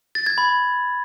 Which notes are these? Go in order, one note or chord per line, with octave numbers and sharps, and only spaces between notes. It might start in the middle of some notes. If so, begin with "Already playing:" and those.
A6
G#6
B5